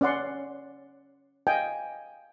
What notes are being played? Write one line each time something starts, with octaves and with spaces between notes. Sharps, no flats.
C#4 D5 F#5 C6
D#5 F5 G5 G#5